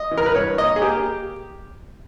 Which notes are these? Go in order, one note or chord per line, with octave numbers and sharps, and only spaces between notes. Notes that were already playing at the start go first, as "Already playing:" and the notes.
Already playing: D#5
E3
A#4
B4
G2 C#5
A#3 D#5
G#4
A#3 G4